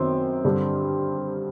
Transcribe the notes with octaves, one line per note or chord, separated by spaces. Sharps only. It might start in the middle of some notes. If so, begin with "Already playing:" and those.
Already playing: F#2 D#3 F#3 B3 C4
G2 D3 G3